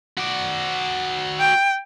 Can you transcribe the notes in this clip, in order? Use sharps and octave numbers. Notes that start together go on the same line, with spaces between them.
F#4 D5
G5